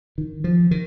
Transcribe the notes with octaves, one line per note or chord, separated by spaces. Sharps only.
D#3
F3
D#3